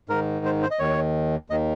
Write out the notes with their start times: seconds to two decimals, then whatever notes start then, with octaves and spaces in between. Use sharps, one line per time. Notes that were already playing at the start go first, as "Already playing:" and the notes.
0.09 G#2 D#3 A#4
0.45 C5
0.62 C5
0.71 D#5
0.79 D#2 D#3 C#5
1.50 D#2 D#3 D#5